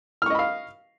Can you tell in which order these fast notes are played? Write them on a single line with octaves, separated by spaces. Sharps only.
F6 C#6 D#5 B5 F5